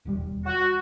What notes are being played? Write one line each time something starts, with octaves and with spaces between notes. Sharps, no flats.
E1 D#2 G3
F#4